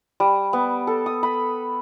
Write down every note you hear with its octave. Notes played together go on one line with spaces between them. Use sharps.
G3
B3
A4
D#6
B5